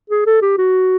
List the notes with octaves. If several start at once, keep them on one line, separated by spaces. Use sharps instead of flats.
G#4
A4
G4
F#4